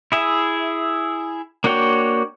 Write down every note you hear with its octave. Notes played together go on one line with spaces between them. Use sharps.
E4 G#4 E5
A#3 D4 F#4 C#5 G5